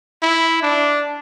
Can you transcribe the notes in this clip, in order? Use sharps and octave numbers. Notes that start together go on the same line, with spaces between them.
E4
D4